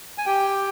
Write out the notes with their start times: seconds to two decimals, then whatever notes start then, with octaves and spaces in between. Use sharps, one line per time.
0.18 G#5
0.26 G4 G5